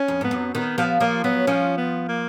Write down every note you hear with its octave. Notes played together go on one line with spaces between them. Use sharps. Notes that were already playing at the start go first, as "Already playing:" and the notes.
Already playing: C#4
F2
G#2 B3
F#2
D#3 B3
F3 B3
F3 A#3
F#3 B3
F3 C#4
B3
A#3